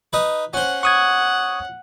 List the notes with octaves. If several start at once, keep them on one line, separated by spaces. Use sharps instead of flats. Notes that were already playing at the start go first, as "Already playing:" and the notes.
D#4 B4
C#4 C5 F#5
F#5 C#6 D#6 G#6